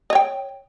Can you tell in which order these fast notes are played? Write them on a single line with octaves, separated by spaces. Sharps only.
D#5 C#5 G5